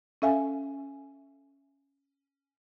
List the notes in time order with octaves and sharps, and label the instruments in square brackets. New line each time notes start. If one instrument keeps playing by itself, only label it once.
[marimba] C#4 A4 E5 F5 G#5